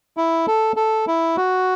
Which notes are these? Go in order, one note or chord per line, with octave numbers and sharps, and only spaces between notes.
E4
A4
A4
E4
F#4